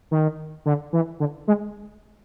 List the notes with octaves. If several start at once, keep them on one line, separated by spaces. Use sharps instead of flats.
D#3
D3
E3
D3
G#3